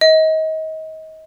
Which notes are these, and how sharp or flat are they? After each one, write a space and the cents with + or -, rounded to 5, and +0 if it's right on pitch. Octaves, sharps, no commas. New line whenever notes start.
D#5 +30